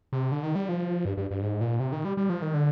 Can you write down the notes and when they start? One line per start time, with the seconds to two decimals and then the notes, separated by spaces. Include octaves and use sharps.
0.13 C3
0.32 D3
0.43 D#3
0.55 G3
0.69 F3
1.05 G2
1.17 G2
1.31 G2
1.42 G#2
1.61 A#2
1.80 C3
1.92 D#3
2.05 G3
2.17 G3
2.29 F3
2.42 D#3
2.54 D3